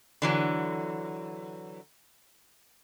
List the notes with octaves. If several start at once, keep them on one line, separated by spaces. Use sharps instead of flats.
D3 E3 F#3